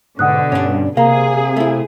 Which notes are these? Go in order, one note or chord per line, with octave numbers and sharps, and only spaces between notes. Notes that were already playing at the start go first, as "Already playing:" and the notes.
G#2 B2 D3 F#5 D#6 F#6
G2 C#4 D4
C3 A#3 G#4 F5 A#5
A3 E4